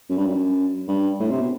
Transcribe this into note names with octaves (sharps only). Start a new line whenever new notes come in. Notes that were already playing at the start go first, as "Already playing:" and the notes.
F#2
G2
F#2
G2
A2
C3
B2